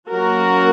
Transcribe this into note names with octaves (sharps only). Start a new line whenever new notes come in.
F#3 A#3 C#4 F#4 A#4